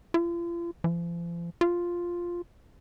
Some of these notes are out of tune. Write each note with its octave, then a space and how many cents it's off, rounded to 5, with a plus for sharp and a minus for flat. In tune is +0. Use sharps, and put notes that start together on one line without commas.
F4 -40
F3 -40
F4 +0